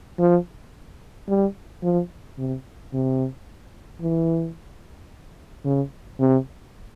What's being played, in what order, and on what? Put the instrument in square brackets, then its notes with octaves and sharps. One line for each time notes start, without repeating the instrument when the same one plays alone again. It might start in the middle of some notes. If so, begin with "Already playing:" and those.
[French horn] F3
G3
F3
C3
C3
E3
C#3
C3